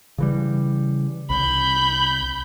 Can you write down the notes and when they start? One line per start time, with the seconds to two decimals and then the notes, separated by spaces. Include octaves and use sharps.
0.18 C#3 E3 G3
1.30 C2 B5 G6